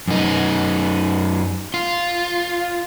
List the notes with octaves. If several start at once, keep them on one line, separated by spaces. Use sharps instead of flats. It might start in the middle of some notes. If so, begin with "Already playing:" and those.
F#2 D#4
F4